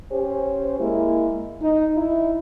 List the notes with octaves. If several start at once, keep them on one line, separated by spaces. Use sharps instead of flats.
C#4 G4 C5
G#3 A#3 E4
D#4
D#4 E4